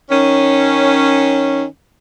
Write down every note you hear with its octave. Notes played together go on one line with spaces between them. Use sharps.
D#3 C#4